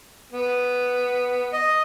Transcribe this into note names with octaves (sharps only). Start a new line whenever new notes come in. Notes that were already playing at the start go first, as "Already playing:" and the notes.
B3
D#5